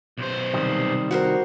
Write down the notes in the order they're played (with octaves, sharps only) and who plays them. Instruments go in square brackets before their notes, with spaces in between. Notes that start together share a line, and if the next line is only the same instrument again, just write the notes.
[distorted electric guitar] B1 C5
[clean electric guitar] C3 D#3 G3
[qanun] F#4 A#4 C5